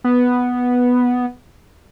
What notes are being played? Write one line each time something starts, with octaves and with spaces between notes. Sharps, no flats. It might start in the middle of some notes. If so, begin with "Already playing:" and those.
B3